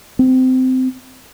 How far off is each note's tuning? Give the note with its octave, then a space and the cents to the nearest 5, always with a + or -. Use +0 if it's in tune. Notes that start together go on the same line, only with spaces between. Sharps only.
C4 -20